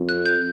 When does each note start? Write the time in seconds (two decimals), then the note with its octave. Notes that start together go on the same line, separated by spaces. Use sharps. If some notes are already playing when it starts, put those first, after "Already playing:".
Already playing: F2
0.09 F#6
0.26 G6